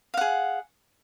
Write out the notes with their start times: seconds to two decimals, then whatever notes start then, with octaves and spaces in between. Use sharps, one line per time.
0.14 F5
0.17 F#5
0.21 G#4